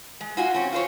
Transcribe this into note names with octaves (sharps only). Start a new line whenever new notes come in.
G#3
F4 F#4 G#5
C4 C#4
F4 C5 C#5